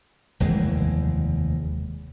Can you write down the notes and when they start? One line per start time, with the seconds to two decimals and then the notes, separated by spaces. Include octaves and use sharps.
0.40 F1 D#2 E3 G#3